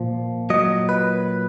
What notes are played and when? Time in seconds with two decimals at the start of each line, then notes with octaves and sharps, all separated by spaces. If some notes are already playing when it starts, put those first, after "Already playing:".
Already playing: A#2 F3
0.50 A#2 F#3 D#5
0.89 B4